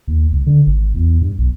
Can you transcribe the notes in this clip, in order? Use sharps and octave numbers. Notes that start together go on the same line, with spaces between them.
D#2
C#2
D3
G#1
E2
G2
B1